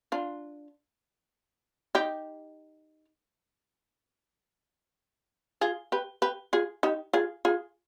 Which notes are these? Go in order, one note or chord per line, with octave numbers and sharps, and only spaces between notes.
D4 F4
D#4 G4
F4 G#4
G4 B4
G4 B4
F4 G#4
D#4 G4
F4 G#4
F4 G#4